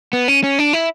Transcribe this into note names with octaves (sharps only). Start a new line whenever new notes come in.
B3
C#4
C#4
D4
E4